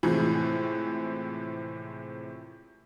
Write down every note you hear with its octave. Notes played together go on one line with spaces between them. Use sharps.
A2 C3 E3 F3 G#3